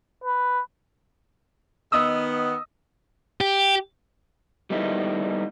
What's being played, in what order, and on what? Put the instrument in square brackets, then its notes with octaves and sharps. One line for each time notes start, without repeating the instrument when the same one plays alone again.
[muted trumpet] B4
[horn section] D#3 B3 [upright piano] D#5 D#6 E6
[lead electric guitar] G4
[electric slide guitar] G3 A3 B3 D#4 E4